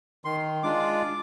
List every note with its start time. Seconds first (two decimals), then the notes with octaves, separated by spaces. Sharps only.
0.25 D#3 C6
0.63 G#3 D4 F4 D6